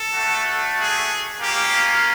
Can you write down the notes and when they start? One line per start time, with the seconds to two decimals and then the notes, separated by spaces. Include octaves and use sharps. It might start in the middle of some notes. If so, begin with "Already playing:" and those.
Already playing: A4
0.14 A3 D4 F#4
0.77 G#4
1.39 A#3 C#4 F4 G4